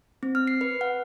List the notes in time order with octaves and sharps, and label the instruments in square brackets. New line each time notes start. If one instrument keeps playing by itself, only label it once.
[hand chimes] C4
F6
C7
B4
F#5